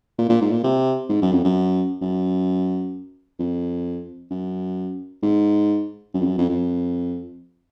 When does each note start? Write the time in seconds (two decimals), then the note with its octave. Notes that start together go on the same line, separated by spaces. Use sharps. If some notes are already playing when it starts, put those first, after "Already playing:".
0.18 A#2
0.29 A#2
0.41 G#2
0.52 A#2
0.64 C3
1.09 G#2
1.22 F#2
1.32 F2
1.44 F#2
2.01 F#2
3.39 F2
4.30 F#2
5.22 G#2
6.14 F#2
6.20 F2
6.25 F#2
6.38 F2
6.49 F2